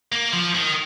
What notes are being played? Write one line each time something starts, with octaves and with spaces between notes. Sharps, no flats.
A#3
F3
D#3